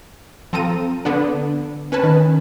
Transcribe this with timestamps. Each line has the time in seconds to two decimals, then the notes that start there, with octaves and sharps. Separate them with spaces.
0.53 F3 C4 A4 A#5 D#7
1.05 D3 B3 D4
1.92 C#4 B4 G#5 A5 B5
2.03 D#3